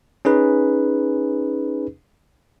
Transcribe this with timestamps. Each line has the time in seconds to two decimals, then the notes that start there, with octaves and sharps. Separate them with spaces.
0.25 C#4 D#4 G#4 B4